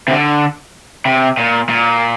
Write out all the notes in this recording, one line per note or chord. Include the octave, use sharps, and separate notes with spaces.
C3
D3
C3
A#2
A#2